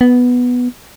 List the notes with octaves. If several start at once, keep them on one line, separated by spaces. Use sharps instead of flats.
B3